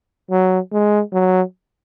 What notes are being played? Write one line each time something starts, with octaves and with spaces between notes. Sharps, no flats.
F#3
G#3
F#3